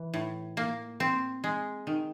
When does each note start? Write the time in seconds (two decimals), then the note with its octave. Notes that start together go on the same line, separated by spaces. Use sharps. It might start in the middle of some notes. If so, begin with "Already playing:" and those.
Already playing: E3
0.14 A2
0.57 A#3
1.00 C4
1.44 G#3
1.87 D#3